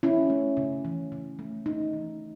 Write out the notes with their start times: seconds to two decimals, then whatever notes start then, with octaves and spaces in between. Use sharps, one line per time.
0.03 C#3 C#4 E4
0.30 A3
0.57 C#3
0.85 E3
1.12 C#3
1.39 A3
1.66 C#3 D#4
1.93 E3